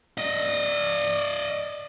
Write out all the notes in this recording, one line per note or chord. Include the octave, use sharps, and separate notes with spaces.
D5 D#5